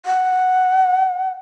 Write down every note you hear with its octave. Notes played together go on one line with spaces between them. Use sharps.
F#5